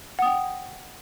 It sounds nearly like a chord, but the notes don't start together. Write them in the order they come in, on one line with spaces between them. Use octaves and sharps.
F#5 D#6 G5